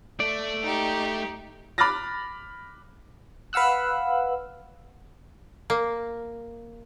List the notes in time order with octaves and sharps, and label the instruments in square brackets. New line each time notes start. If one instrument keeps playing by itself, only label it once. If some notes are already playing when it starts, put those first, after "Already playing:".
[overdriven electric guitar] A3 [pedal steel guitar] D5
[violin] D#4 G4
[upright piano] B5 D6 F6 F#6 A6 A#6
[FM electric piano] B4 F5 F#5 E6 F#6
[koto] A#3